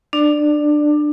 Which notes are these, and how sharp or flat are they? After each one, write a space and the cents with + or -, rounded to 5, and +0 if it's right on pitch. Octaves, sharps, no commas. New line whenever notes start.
D4 +20 D5 +10